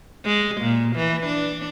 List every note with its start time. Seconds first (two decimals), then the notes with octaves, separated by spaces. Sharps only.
0.24 G#3
0.61 A#2
0.96 E3
1.26 D4